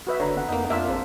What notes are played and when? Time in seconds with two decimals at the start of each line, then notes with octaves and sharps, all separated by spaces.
0.07 F#4 B4 E5
0.20 F#1 D3 C#5 A#5
0.36 B3 F#5
0.49 F2 A#3 D#4
0.70 F2 A#3 D4 F4 E5 F5
0.88 A1 C4 G#4 C5